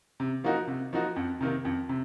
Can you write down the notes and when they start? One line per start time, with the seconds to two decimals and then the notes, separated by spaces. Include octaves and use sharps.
0.20 C3
0.44 F3 A#3 D#4 F#4
0.67 C3
0.93 F3 A#3 D#4 F#4
1.16 F2
1.41 C3 D#3 A#3
1.65 F2
1.89 C3